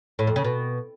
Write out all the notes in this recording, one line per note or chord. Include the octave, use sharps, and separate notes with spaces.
A2
F2
C#3
B2